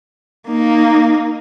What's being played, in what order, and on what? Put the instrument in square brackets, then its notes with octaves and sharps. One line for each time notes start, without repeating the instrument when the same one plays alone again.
[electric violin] A#3 D#4